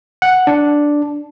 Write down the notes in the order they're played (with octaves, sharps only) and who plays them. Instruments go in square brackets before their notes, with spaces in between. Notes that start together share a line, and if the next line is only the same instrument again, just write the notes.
[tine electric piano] F#5
D4